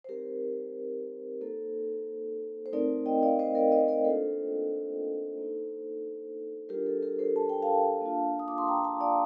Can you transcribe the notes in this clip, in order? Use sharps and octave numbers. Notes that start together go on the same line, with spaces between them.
C5
G3 C4 D#4 G4 A#4
A#3 D#4 A4 C5
C5
A3 C4 D#4 A#4 D5
D#5 G5
D5 F5
C5 D#5
A#4 D5
C5 D#5
A#4 D5
A#3 D4 F4 A4 C5
A#3 D#4
G3 D4 F4 G4 A#4
A4
G4 A#4
A4 C5
A5
G5
F5 A5
A#3 D4 F4
D#6
D6
C6
G5 A#5
F5 A5
D5 F5